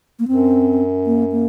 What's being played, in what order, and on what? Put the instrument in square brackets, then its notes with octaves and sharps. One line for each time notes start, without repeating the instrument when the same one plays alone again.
[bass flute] A#3
[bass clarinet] F#2 [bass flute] C4
[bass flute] A#3
A#3